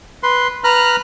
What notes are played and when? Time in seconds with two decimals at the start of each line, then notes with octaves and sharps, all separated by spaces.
0.23 B4 C6
0.64 B4 A#5 F6 F#6